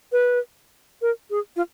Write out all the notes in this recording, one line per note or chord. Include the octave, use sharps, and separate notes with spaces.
B4
A#4
G#4
F4